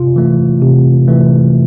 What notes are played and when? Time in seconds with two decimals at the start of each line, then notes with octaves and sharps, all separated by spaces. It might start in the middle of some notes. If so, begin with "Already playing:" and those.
Already playing: C3 F4
0.16 E3 A3
0.62 C3
1.08 E3 A3